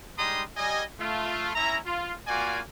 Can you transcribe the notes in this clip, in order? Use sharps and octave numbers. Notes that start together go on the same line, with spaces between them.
G3 G#3 D#4 A#5 C6 D#6
G3 D#5 G#5
A3 F4
C#4 E4 E5 A#5
F4
A#3 F4 F#4 D5 G#5